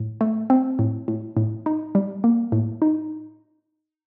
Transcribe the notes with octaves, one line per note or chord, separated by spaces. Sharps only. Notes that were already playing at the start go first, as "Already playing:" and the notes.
Already playing: A2
A3
C4
A2
A2
A2
D#4
G3
A#3
A2
D#4